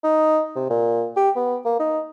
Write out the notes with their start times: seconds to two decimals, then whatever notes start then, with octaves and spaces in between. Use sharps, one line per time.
0.04 D#4
0.56 C3
0.70 A#2
1.17 G4
1.36 B3
1.65 A#3
1.79 D#4